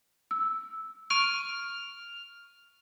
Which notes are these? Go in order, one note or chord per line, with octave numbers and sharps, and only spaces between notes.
E6
C#6 F6 D7 D#7